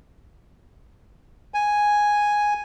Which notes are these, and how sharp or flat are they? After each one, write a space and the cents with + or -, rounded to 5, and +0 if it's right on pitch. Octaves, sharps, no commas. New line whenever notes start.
G#5 +0